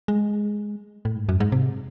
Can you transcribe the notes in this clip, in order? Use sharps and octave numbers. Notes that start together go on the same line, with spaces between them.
G#3
A2
G#2
F#2
G#2
C3